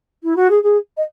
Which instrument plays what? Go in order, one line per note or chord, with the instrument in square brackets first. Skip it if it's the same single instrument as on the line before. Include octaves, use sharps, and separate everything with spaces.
[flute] E4
F#4
G#4
G#4
D#5